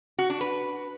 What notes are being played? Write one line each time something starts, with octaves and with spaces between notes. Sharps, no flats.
F#4
D4
B4